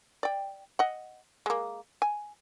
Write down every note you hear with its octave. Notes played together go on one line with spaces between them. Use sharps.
D5 G5
D#5 F#5
G#3 A#3
G#5